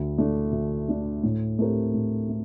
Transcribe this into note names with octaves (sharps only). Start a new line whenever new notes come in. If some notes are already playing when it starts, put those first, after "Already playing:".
Already playing: D2
D3 A3 D4
D2
D3 A3 D4
A2
A3 C4 G4 A#4
A2
A3